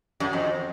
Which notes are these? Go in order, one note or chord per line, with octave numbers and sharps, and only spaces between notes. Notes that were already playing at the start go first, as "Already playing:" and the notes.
F#2
F2